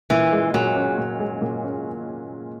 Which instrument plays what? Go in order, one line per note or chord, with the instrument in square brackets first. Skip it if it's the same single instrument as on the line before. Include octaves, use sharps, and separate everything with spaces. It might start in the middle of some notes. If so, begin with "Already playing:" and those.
[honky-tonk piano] A#2 [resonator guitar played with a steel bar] E3
[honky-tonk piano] G#3
[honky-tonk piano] A#2 [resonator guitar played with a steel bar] F#3
[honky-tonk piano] C#4
A#2
G#3
A#2
C#4